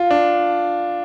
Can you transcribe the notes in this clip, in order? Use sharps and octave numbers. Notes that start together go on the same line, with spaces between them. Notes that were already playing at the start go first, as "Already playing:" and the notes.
Already playing: F4
D4